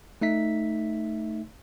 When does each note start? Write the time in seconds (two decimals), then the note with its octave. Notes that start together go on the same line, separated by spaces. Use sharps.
0.21 A3 D#4 E5 B6